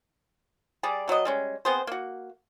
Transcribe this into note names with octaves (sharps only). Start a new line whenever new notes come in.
G3 G#4 D5
B2 F#3 G3 D#5
G3 G#3 C#4
B3 C4 G#4 C5
A#3 F#4